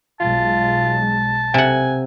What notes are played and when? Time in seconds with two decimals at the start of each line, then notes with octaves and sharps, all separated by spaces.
0.20 B1 F#3 G#3 F4 A5
1.54 C3 F#5 G#5